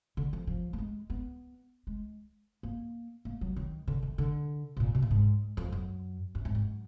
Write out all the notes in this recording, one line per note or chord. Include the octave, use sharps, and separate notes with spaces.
D3
F3
F3
A#3
G#3
B3
G#3
A#3
A#3
F#3
D#3
D3
D#3
D3
B2
A#2
B2
A#2
G#2
F2
F#2
F#2
G#2
F#2